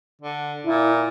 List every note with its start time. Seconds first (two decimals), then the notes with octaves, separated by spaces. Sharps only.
0.22 D3
0.66 A#2 E4